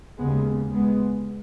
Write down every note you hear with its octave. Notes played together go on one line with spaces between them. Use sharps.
D#2 C#3 G#3 B3
G#3 B3